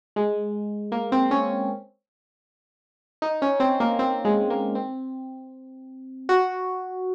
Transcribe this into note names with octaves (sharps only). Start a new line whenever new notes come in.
G#3
A#3
C4
C#4
D#4
C#4
C4
A#3
C4
G#3
A#3
C4
F#4